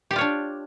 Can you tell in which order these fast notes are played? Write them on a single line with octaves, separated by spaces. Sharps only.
G4 D5 F4 C#5 D4